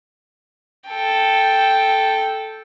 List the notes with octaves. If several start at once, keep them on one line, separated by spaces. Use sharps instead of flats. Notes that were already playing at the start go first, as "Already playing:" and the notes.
A4 G5